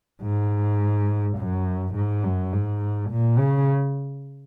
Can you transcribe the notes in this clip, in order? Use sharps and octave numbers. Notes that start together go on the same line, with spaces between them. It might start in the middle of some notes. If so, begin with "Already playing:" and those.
G#2
F#2
G#2
F#2
G#2
A#2
C#3